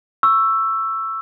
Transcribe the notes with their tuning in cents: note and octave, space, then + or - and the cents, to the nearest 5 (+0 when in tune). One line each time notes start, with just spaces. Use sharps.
C#6 +0 E6 +10